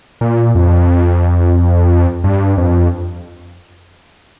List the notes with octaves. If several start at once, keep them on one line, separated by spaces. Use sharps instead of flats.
A#2
F2
G2
F2